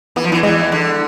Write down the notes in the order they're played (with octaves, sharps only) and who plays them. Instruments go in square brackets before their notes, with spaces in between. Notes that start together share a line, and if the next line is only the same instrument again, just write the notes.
[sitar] E3 [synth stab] B3
[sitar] F3
E2 E3
[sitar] E2 E3 [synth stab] G#3
[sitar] D3